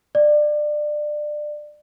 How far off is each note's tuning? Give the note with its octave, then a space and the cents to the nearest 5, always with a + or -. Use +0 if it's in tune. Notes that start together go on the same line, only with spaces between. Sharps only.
D5 +25